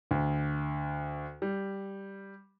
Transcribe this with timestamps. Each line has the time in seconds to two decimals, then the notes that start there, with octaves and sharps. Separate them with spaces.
0.11 D2
1.42 G3